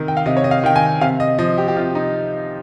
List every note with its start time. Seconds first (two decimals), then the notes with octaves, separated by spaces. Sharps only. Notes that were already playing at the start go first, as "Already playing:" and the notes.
Already playing: C3 D#3
0.08 G5
0.17 F5
0.26 C3 D#5
0.37 C#5
0.44 D#5
0.51 F5
0.64 D#3 G5
0.76 G#5
1.01 C3 F5
1.20 D#5
1.38 F3 D#5
1.58 G4
1.68 G4
1.76 C3 F4
1.95 D#4